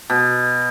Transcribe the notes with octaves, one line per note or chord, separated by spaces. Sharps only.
B2